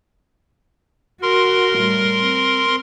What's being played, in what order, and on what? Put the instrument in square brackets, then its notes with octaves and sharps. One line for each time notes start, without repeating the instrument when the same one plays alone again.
[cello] F#4 [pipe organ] A#4 C6
[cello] A2 G3
C4